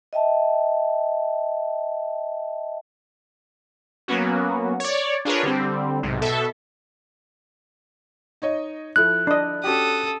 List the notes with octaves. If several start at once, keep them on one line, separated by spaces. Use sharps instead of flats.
D#5 E5 G5 A5
F#3 A#3 B3 C#4 F#4
C#5 D5
D4 F4 G#4 A#4 B4 C#5
D3 G3 C4
B1 G#2 C3
B2 A4 E5
D#4 C#5 D#5
F3 E4 A4 F#6
D4 D#5
C#4 F#4 G4 A4 D#6